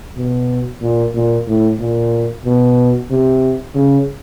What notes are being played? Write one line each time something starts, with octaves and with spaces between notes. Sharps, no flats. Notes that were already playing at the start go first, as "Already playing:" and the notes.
B2
A#2
A#2
A2
A#2
B2
C3
C#3